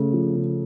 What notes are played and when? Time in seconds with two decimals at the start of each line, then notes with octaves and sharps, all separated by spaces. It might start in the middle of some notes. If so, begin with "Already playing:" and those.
Already playing: C#3 A3
0.13 F3
0.35 C#3